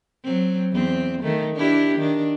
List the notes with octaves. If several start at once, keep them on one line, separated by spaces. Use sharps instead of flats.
F#3 C4
E2 C4
D#3 A3
D4 E4 G4
D#3 D4